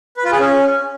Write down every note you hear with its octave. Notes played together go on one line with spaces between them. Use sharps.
B4
F4
G#4
C#4